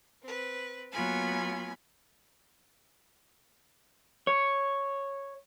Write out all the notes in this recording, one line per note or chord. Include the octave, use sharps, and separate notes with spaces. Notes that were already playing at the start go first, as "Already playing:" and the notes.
C4 B4
F#3 A#3 B3 F4 G#5 B5
C#5